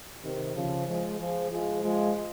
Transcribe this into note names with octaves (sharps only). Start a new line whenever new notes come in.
C3 D#3
C#3 F3
F3 G#3
F3 G#3
F3 G#3
F3 G#3